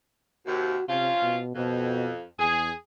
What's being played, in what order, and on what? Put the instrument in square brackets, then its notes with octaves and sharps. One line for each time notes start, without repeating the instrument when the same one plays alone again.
[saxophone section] D#2 C3 [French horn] F#4
[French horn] C3 [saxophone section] F3 C#4 F4
[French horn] B2
[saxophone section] F2 [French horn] B2
[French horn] E2 [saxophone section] G#4